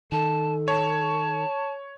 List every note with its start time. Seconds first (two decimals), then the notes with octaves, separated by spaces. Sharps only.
0.12 D#3 A4 A5
0.68 C#5 A5